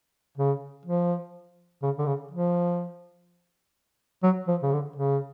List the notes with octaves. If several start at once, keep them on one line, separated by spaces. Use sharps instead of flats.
C#3
F3
C#3
D3
C#3
F3
F#3
F3
C#3
D3
C#3